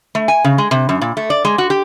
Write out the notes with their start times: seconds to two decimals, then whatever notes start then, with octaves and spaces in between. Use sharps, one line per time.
0.15 A3
0.28 G#5
0.44 C#3
0.58 G#3
0.71 C3
0.89 F#2
1.01 A#2
1.17 A3
1.30 D5
1.45 G#3
1.58 F#4
1.70 G4